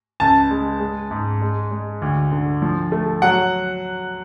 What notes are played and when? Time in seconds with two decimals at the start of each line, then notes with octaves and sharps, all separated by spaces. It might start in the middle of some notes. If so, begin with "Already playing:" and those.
0.20 C#2 A5
0.51 G#3
0.80 G#3
1.11 G#2
1.42 G#3
1.71 G#3
2.02 D2
2.32 D3
2.62 F3
2.92 A3
3.22 F#3 F#5